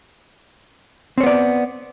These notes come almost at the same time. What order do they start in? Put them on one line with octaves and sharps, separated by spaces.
C4 C#5 B3 D5